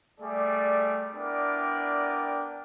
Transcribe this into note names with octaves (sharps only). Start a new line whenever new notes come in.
G3 A3 G#4 D5
B3 D4 E4 A#4 D5 G5